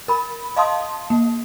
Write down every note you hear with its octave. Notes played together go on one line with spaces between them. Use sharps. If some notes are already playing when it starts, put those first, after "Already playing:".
A#4 B5
D#5 F5 A5 C6 D#6
A#3